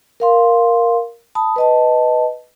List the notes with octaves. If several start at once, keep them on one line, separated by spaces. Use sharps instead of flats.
A#4 F5 C6
A5 B5 D#6
B4 D#5 A5